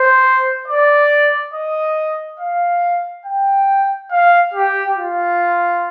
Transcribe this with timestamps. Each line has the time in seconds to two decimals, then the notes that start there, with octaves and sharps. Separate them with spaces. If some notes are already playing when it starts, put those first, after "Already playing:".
Already playing: C5
0.68 D5
1.54 D#5
2.39 F5
3.26 G5
4.11 F5
4.54 G4
4.98 F4